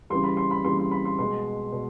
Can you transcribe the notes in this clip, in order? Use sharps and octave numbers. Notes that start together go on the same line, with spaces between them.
C#3 E3 G3 C6
B5
C6
B5
C#3 E3 G3 C6
C6
B5
C6
B2 G#3 C6
B2